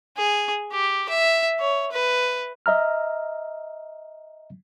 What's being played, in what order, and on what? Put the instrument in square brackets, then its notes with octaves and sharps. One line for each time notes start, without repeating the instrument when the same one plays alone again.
[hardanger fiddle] G#4
G4
E5
C#5
B4
[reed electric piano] D#5 E5 A#5 F6